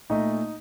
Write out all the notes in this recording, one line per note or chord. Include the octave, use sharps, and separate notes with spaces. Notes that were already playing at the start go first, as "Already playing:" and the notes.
A#2 A3 D#4 D#5